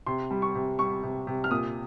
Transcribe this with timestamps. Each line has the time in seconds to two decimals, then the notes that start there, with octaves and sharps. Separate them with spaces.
0.07 C3 C6
0.31 G3
0.42 C#6
0.55 C3
0.79 G3 C#6
1.03 C3
1.27 C3
1.44 F6
1.50 A#2 D#6